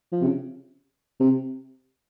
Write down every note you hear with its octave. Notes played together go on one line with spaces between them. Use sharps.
F3
C3
C#3
C3